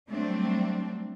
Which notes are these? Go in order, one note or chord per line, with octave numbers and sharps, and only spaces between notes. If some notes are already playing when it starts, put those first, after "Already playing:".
F#3 G3 A3 C4 D4